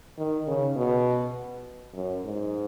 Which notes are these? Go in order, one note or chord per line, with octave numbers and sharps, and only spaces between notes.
D#3
C#3
B2
F#2
G#2